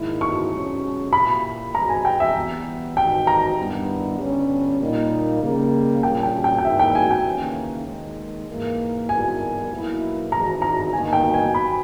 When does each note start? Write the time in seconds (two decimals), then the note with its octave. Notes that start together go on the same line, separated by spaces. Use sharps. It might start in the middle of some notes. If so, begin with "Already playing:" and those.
Already playing: G#2 D#3 A#3 E4
0.21 C#6
0.52 B1 B2 G#3 C#4
1.13 A#2 A#3 E4 G4 B5
1.74 G1 G2 E3 G#3 A#5
1.89 G#5
2.05 G5
2.20 E5
2.35 E3 G3 B3
2.97 G#1 G#2 D#3 G5
3.27 A#5
3.58 G2 D#3 G3 B3 E4
4.19 G1 G2 G3 C#4
4.81 A#2 G3 A#3 D#4
5.42 C#3 G3 A#3
6.03 A#1 A#2 G3 C#4 G4 G5
6.23 G5
6.44 G5
6.58 G5
6.65 G#2 D#3 G3 A#3 E4 E5
6.79 G5
6.95 G#5
7.11 G5
7.25 D#2 C#3 E3 A#3 C#4
7.87 D#2 D#3 G#3
8.48 G#2 E3 A#3
9.09 G#2 G3 B3 E4 A#4 G#5
9.70 B1 B2 A#3 E4
10.32 G#1 G#2 E3 A#5
10.62 A#5
10.93 G1 G2 D#3 A#3 D#4 G#5
11.13 G5
11.34 G#5
11.54 B5